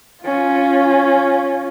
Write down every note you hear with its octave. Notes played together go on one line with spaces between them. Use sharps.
C#4 F4